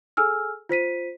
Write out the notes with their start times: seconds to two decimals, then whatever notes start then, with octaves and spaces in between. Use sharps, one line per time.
0.17 G#4 A4 G#5 E6 F6
0.69 F4 C5 B6 D#7